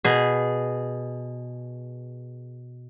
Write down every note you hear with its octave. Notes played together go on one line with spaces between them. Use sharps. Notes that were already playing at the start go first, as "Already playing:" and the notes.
B2 G#4